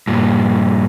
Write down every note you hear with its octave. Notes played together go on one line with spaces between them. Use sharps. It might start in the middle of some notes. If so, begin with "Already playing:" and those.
G2 A#2